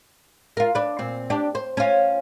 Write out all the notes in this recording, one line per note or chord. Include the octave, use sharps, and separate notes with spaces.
F4 A#4
D4 B4
A#2 C4
D4 G4
C5
C#4 F4